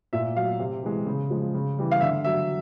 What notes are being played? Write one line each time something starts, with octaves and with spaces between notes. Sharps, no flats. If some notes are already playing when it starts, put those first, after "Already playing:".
A#2 E5
F#3 F5
C3
E3 G#3
C#3
F3 G#3
C#3
E3 G3
F5
D3 E5
F#3 E5